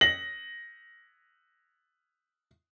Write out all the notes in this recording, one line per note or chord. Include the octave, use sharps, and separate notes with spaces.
A#6 F#7